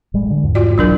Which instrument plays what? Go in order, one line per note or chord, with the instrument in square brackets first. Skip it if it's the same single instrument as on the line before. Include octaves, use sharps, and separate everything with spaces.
[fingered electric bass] A1 G3 G#3
D3
E2 G#2
[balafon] F4 F#4 D5
[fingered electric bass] B1 E3 [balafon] F#3 D4 A#4